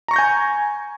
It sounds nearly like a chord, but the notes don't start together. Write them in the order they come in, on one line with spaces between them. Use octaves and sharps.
A#5 C#6 A#6 G6 G#5